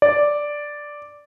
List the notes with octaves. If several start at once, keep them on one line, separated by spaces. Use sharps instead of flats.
D5